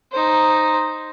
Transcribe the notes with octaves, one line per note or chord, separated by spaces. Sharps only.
D#4 C5